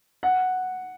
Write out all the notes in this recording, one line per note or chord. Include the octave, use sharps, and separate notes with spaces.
F#5